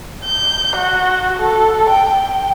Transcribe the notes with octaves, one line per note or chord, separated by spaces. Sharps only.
G6
F#4
A4
G5